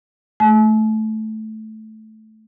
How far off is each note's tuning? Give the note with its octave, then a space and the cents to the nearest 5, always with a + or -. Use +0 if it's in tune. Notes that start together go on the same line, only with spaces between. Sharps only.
A3 -10 A5 -45